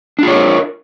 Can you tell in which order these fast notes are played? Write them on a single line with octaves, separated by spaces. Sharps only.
D4 F4 C#5 A4 A#4